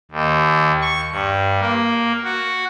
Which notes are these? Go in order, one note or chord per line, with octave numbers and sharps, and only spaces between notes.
D#2
C#6
G2
A#3
F#4